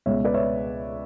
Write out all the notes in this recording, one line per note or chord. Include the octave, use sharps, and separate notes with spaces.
C#2 B2 C#5 E5
B4 D5
C#5 E5